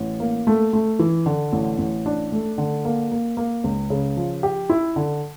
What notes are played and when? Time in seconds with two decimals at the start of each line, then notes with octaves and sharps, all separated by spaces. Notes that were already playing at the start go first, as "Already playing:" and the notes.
Already playing: A1
0.20 A#3
0.47 A3
0.73 A3
0.99 E3
1.26 D3
1.53 A1
1.79 A1
2.06 D4
2.32 A3
2.58 D3
2.85 A#3
3.11 A#3
3.37 A#3
3.64 C#2
3.90 C#3
4.17 F3
4.43 G4
4.70 E4
4.96 D3